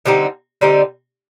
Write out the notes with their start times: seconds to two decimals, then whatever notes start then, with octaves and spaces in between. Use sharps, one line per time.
0.06 D3 G3 C4 D#4
0.61 D3 G3 C4 D#4